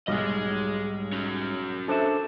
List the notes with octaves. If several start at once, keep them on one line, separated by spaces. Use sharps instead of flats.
B1 G#2 G3 G#4 D#5
C#4 F#4
D4 A4 C5 E5 A5